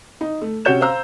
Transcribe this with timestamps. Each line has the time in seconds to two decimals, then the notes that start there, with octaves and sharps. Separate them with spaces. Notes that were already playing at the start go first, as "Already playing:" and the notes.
0.21 D#4
0.41 A3
0.65 C3 C#4 F#4 C#5 G6 E7
0.81 C5 F5 A#5 E6